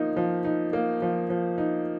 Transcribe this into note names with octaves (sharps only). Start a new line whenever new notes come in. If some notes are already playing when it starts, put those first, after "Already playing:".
Already playing: F3 A#3 D#4
F3
D#4
A#3
F3
F3
D#4